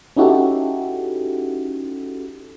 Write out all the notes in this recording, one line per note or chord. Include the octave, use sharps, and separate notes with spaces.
C#4 D#4 E4 F#4 G4 A4